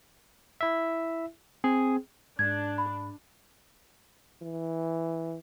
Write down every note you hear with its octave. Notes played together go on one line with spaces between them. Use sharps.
E4 E5
C4 G#4
G#2 D4 G#6
B5
E3